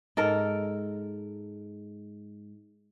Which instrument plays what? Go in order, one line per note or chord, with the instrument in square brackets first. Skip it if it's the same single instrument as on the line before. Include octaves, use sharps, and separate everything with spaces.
[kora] G#2 A4 A#4